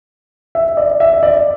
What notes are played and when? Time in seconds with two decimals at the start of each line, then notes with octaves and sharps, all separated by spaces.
0.55 E5
0.77 D5
1.00 E5
1.23 D5